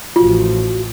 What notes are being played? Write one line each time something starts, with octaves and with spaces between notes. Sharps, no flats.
A1 F3 F4 F#4